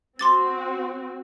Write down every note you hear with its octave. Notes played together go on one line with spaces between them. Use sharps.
C4 F#4 C6 D6 A6